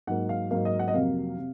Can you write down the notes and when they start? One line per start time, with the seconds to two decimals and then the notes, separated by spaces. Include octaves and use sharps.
0.07 G#2 F#3 A#3 F#5
0.29 F5
0.51 G#2 F#3 A#3 F5
0.65 D#5
0.79 F#5
0.88 D#5
0.94 F2 C3 F#3 A#3 F5
1.38 C3